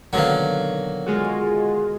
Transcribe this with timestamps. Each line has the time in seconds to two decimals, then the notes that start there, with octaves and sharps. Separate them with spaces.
0.13 B2 D3 D#3 F#3 A#3
1.07 G#3 F4 F#4 G#4